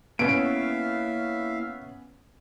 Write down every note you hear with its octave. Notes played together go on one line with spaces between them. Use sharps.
A#3 B3 C#4 E4 C#5 E5 F5 D7